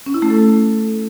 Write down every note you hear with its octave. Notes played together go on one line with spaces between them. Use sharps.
C#4
E4
A3
A4